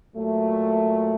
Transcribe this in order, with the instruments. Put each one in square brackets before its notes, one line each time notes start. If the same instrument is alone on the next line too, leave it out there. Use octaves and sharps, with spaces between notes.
[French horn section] A#2 F#3 A3